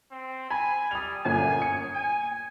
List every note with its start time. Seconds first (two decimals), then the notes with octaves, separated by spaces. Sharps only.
0.11 C4
0.50 G#5 B5
0.91 G3 D#6 F7
1.25 G1 F#2 A#2 G#5
1.59 D#6 C#7
1.95 G#5